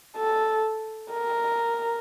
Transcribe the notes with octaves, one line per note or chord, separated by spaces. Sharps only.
A4
A#4